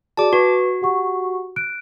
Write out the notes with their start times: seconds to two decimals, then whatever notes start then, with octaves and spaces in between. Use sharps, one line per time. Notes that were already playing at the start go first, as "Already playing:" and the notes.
0.17 F#4 G#4 D5 A5 D6
0.33 F#4 B4
0.82 G4 F#5 C#6
1.56 F#6 D7